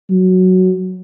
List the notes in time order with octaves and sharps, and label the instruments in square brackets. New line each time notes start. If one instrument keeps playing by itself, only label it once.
[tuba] F#3